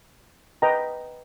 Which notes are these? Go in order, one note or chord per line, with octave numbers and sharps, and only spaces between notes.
B4 D#5 G5 A#5